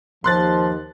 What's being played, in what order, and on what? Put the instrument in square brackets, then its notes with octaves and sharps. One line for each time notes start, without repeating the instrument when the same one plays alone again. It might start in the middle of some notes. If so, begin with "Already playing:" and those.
[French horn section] D#2 [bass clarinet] F3 [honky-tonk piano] C6 F#6 A6